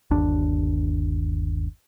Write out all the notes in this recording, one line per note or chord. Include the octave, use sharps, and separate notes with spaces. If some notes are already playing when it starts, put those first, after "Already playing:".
G1 D#2 D4